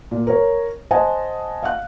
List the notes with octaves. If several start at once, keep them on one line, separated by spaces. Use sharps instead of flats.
A#2
A#4 C#5
C5 D#5 F#5 G#5 A5
F5 F#5 F#6